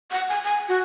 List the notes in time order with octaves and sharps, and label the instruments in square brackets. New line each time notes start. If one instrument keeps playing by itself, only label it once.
[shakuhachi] F#5
G#5
G#5
F#4